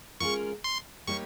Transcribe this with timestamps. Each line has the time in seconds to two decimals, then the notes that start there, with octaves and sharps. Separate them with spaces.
0.20 G#3 C#4 F4 A#4 C#6
0.64 C6
1.07 G3 A#3 D#4 G4 C#5 C#6